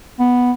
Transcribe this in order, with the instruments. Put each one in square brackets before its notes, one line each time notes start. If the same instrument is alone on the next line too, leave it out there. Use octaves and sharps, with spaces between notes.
[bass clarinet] B3